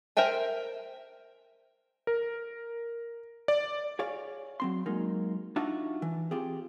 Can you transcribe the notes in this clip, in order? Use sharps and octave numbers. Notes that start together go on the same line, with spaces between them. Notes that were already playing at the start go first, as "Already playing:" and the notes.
A#4 C5 E5 G5 G#5
A#4
D5
G#4 C#5 D5 F5
F#3 C4 C6
F#3 G#3 A#3 D#4
D4 D#4 F4 F#4 E5 A5
E3
C4 F4 G4 G#4